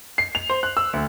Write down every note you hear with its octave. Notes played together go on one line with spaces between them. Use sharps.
C7
F7
C5
F#6
E6
D2